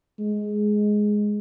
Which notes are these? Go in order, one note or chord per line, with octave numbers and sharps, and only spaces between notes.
G#3